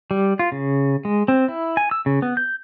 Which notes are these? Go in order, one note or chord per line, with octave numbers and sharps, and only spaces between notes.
G3
F4
C#3
G#3
C4
E4
G#5
E6
C#3
B3
G6